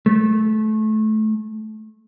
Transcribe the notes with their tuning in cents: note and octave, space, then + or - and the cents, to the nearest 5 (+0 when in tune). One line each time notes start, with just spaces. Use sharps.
A3 -20